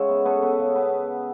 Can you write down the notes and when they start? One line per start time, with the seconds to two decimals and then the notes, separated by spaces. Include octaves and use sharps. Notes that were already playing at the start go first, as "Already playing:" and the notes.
Already playing: C#3 G#3 C#5 E5 F#5
0.09 B3
0.25 B3 A4 C#5
0.43 B3
0.59 C#3
0.76 B3